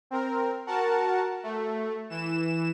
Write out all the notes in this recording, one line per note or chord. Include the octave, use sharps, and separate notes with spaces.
C4 A#4
F#4 A#4 F#5 A5
A3
E3 E7